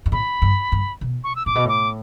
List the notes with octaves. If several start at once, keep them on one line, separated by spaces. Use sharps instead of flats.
G2
A2 B5
G2
G2
B2
C#6
E6
A2 D6
B2
A2 D6